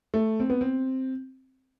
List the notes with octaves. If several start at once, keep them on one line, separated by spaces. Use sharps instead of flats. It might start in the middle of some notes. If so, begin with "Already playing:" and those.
A3
C4
B3
C4